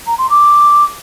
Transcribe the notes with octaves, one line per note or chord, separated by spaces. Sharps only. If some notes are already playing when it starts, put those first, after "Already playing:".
A#5
C6
D6